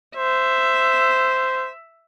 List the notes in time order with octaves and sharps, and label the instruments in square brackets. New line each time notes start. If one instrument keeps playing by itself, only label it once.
[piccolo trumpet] C5 [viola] E5